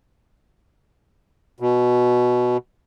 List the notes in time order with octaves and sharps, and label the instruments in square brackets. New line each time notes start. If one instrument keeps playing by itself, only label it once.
[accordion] B2